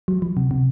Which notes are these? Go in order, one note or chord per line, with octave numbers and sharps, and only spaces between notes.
F#3
F3
C3
C3